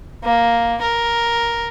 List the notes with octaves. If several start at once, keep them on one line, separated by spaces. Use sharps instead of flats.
A#3
A#4